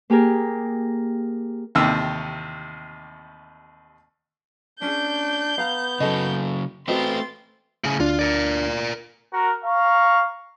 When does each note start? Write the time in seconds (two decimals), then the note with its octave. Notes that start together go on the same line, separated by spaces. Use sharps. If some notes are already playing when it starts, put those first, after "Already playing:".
0.10 A#3 G4 G#4 A#4
1.75 A1 D#2 C3 E6
4.82 C#4 D4 G#4 G6
5.58 B3 F5 A#5
6.00 C#3 F#3 A4 D#5
6.88 A3 C4 F#4 A4 B4 D#5 C6 A6
7.84 A2 C#3
8.00 D2 D4 F4
8.19 A#4 D5
9.33 F#4 A#4
9.65 F5 A#5 C#6